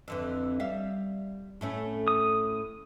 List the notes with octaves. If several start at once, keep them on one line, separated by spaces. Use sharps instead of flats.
F2 D3 E3
G3 E5 F5
A2 A3 C#4
D#6